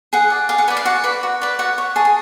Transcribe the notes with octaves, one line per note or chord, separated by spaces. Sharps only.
G#4 F#5
D5
G#4 F5
F#5
B4 D5 G#5
F5
F#4 F#5
B4 D5
F#4
B4 D5
F#4 F#5
C#5
G#4 A5
G#5